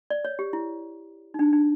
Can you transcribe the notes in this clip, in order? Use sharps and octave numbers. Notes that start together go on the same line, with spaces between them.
D5
C#5
G4
E4
D#4
D4
D4